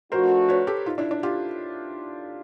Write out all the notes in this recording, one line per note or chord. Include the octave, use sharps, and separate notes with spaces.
F3 A3 D4 F#4 A#4 C5
B4 C#5
G4 A4
D#4 F4
D4 E4
D4
F4 G4